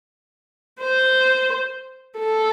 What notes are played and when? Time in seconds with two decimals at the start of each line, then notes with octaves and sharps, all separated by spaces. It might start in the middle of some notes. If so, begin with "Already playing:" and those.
0.81 C5
2.19 A4